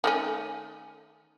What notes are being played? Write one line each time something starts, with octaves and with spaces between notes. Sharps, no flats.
D#3 A3 C#4